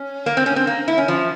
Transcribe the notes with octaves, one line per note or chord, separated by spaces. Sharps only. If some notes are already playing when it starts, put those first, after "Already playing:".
Already playing: C#4
A#3
C4
C#4
C4
A#3
E4
C#4
F3